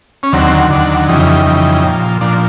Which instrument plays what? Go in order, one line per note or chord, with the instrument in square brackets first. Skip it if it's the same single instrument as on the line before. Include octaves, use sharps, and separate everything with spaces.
[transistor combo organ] C#4
D#2 D3 F#3 C4
D#2 D3 F#3 D4
F2 C#3 E3 G3 D#4
F2 C#3 E3 G3
A#2 F3
A#2 F3 D4